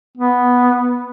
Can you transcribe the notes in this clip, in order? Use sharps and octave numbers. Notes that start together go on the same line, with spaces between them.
B3